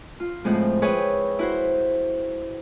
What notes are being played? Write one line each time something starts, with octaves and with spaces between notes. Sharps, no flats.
F4
A2 F3 G#3 C4
G#4 B4 C#5 E5 G5
E4 F#4 C5